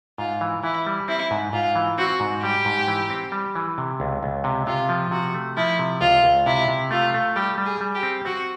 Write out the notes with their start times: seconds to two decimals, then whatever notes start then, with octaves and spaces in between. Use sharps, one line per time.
0.18 G#2 F4
0.41 E3
0.64 E3 E4
0.87 G3
1.08 C4 E4
1.31 G#2
1.53 G#2 F4
1.76 E3
1.98 C4 F#4
2.20 G#2
2.43 G3 G4
2.65 G#2
2.88 E3
3.10 C4
3.32 G3
3.56 E3
3.78 C3
4.00 C#2
4.23 C#2
4.44 C3
4.67 C3 F4
4.89 F3
5.11 C3 F#4
5.34 A3
5.57 F3 E4
5.79 C3
6.01 C#2 F4
6.24 C#2
6.46 C3 E4
6.68 C3
6.91 A3 F4
7.14 A3
7.36 G3 G4
7.58 G3
7.66 G#4
7.81 G3
7.95 G4
8.03 C4
8.25 C4 F#4